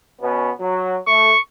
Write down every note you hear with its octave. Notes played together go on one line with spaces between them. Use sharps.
B2 B3 C#4
F#3
A3 C#6